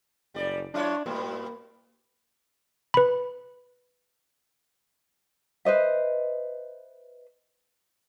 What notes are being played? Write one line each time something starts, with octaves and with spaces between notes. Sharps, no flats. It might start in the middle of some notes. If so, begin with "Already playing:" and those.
F#1 G3 D5
F#3 D4 E4 C#5
G#2 B2 G3 A#3
B4 B5
B4 C5 D#5 E5